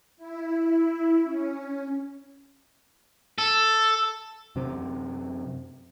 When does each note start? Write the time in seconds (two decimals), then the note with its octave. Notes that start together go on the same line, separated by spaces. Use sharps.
0.17 E4
1.24 C#4
3.38 A4
4.56 F#2 C3